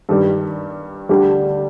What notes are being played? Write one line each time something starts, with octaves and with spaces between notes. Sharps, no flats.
G2 D#3 G3
D2 D3 G3 D4 G4